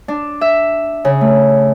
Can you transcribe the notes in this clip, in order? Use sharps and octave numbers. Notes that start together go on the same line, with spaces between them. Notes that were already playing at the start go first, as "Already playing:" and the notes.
D4
E5
C#3
A3